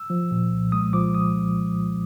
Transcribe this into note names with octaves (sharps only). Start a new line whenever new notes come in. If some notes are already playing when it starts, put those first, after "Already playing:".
Already playing: E6
F3
A#2
C2
G#3 D#6
F3 D6
A#2 D#6